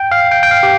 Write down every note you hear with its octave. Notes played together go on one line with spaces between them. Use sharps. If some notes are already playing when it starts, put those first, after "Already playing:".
Already playing: G5
F5
G5
G5
F5
G4